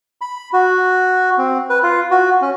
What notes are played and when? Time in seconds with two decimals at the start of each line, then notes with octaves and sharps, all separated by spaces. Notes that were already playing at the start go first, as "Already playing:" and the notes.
0.21 B5
0.53 F#4
1.38 C4
1.70 B4
1.83 F4
2.11 F#4
2.42 C#4